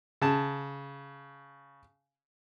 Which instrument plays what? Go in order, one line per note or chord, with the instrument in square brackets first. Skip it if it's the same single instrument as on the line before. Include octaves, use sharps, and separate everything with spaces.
[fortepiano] C#3 A5